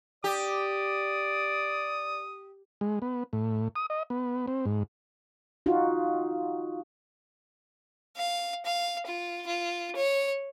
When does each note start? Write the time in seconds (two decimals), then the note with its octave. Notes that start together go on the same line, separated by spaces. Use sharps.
0.24 G4 D5 D#6
2.81 G#3
3.02 B3
3.33 A2
3.76 D#6
3.90 D#5
4.10 B3
4.48 C4
4.66 G#2
5.66 D#4 F4 F#4
8.17 F5
8.65 F5
9.06 F4
9.47 F4
9.96 C#5